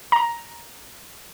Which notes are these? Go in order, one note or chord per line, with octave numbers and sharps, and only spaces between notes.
A#5